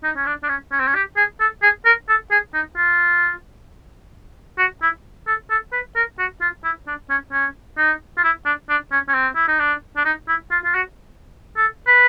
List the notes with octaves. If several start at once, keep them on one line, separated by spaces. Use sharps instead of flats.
D#4
C#4
D4
D4
C#4
C#4
C4
C#4
G4
G#4
A4
G#4
A#4
A4
G#4
D#4
F4
F#4
E4
A4
A4
B4
A#4
F#4
F4
E4
D4
C#4
C#4
D#4
F4
E4
D4
D4
C#4
C#4
C4
E4
D#4
D4
D4
D#4
E4
F4
F4
F#4
A4
B4